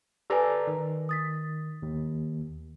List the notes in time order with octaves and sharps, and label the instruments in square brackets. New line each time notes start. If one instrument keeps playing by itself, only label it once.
[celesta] G4 B4 G#5 [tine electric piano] A4 D5 A#5
[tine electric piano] D#3
[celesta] D#6 A6 B6
[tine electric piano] D#2